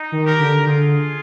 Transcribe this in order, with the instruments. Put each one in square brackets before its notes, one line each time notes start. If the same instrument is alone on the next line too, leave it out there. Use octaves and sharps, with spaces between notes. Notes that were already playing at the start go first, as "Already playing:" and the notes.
Already playing: [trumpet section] D#4
[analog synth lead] D#3
[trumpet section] G4 A#4
[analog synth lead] D3
[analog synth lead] D3 [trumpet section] F4 G#4